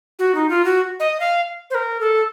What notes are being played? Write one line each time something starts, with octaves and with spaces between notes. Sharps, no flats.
F#4
D#4
F4
F#4
D#5
F5
C5
A#4
A4